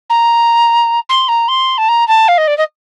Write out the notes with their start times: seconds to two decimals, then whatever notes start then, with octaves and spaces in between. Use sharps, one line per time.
0.10 A#5
1.09 C6
1.28 A#5
1.48 C6
1.78 A5
1.88 A#5
2.08 A5
2.28 F5
2.38 D#5
2.47 D5
2.58 D#5